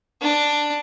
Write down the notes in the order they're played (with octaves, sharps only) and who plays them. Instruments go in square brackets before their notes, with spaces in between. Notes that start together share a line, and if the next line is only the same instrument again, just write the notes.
[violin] D4